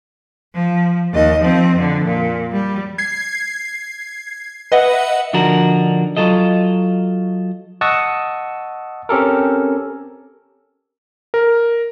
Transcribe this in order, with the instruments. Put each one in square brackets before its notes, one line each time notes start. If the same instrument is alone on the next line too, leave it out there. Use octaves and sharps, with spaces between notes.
[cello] F3
D#2 D#5
F3 C4
F2 D3
A#2
G3
[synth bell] G#6 C7
B4 D#5 E5 F#5
[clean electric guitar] D3 F3 D4 D#4 F#4 A#4
F#3 F4 A4 D#5
[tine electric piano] D#5 F#5 A5 C#6 D#6 E6
C4 C#4 G4 A4 A#4
[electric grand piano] A#4